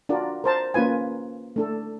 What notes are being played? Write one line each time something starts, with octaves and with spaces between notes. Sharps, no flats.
D4 F4 F#4 A#4 D5
A#4 C5 A5
A#3 C#4 F4 B4 G#5
A3 D4 A4